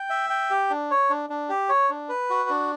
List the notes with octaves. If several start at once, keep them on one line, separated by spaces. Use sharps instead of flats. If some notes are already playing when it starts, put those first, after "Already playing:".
Already playing: G5
E5
G5
G4
D4
C#5
D4
D4
G4
C#5
D4
B4
F#4
D4